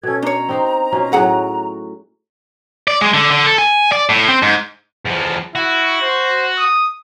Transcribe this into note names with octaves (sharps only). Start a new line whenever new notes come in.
B2 C#4 A4 G#6
D4 C#5 A#5
C4 D#4 C5
B2 C#4 F4
A2 F#3 F#4 G#4 F#5 G#5
D5
G#3
D3
D3
A4
G#5
D5
A2
C4
G#2
E2 F3
E4 F#4
C5
D#6